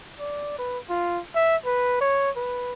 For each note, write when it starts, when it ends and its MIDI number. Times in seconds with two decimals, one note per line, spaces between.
0.20 0.56 74
0.58 0.78 71
0.89 1.20 65
1.35 1.56 76
1.66 1.97 71
2.01 2.30 73
2.36 2.73 71